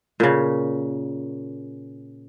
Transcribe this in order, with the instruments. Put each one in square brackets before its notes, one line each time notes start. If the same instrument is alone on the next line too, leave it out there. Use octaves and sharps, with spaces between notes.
[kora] A#2 C#3